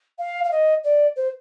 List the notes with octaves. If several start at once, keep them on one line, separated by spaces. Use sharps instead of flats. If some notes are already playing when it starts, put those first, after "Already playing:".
F5
F5
D#5
D5
C5